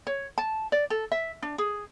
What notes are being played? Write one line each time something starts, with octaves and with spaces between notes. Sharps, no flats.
C#5
A5
D5
A4
E5
D4
G#4